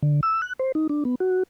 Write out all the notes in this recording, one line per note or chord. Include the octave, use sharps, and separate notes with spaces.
D3
E6
F#6
C5
D#4
D4
B3
F#4